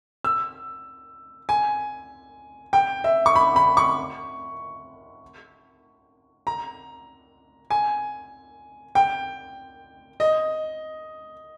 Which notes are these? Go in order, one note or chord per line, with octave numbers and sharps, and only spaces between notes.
E6
G#5
G5
E5
C#6
B5
B5
C#6
A#5
G#5
G5
D#5